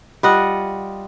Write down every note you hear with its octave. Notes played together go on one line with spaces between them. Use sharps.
G3 F4 D#5 F#5